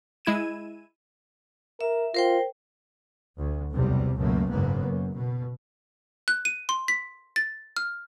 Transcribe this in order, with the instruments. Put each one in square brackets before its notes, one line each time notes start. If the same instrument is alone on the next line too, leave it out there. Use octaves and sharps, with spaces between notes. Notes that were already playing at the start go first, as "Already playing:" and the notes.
[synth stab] G#3 E4 G#6 D#7 E7
[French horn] A#4 [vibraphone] E5
[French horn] F4 [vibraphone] A#4 C5 G5
[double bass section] D2
B1 E2 C3 G3
C#2 F#2 B2 A3 A#3
F#1 G#2 A#3 B3
F#2
B2
[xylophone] F#6
D#7
C6
B6
A6
F6